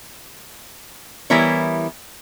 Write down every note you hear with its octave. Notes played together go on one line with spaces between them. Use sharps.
E3 G3 B3 E4 A#4 C#5